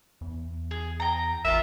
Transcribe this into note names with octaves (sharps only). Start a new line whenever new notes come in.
E2
G#4
G5 A#5
A1 F4 A#4 E5